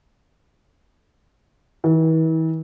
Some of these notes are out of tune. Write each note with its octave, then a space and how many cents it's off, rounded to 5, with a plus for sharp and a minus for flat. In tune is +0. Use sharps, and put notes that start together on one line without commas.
E3 -40